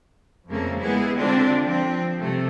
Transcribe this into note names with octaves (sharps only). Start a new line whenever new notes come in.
F2 C#3 A3 A#3
G#3 B3 E4 G#4
D3 C4 D4 F4
F3 C4
C3 A3